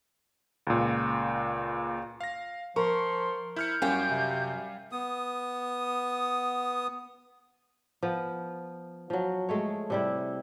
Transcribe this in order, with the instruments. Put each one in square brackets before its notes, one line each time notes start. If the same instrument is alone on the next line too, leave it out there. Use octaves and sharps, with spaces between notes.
[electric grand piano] C#2 A#2
F5 A#6
[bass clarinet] F3 [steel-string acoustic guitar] A#4 [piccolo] C6 [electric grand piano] C#6
[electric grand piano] E4 F6 C#7 [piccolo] G6
[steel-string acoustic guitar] F#2 G5 [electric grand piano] G3 F5 G#5 [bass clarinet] C#4
[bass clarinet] C3
[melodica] B3 D#6
[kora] F3 B3
F3 F#3
G#3 A3 C#5
C3 G3 E4